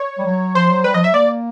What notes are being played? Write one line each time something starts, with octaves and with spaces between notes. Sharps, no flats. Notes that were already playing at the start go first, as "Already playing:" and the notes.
Already playing: C#5
G3
F#3
F3 C5
F#3
G3 B4
F3 D#5
F#3 E5
A#3 D5